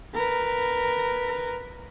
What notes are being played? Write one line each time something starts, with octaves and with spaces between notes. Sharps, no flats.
A#4 B4